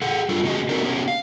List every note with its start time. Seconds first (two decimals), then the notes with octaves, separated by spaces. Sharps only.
0.02 G#4 A4 F#5
0.29 F#2 G3 D4 F4 A4
0.44 A2 C#3 C#4 F#4 G#4 D#5
0.69 C4 D4 D#4 F#4 A4 A#4
0.83 B3 C#4 G4 C#5
1.08 F5